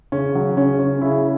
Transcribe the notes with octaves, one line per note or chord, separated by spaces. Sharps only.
C#3 C#4
F#3
C#3 C#4
C#4
C#3 E4